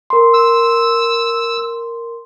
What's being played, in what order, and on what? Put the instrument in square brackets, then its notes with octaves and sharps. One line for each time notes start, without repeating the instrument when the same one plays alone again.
[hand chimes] A#4 C6
[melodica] E6